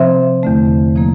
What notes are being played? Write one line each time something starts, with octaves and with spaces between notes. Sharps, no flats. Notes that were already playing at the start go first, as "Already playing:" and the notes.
Already playing: C3 F3 C4 C5 E5
E2 D3 A3
C3 F3 A#3